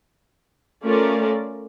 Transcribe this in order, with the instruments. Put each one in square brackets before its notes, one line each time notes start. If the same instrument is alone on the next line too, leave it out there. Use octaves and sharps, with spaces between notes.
[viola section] A3 C#4 F4 A#4 D5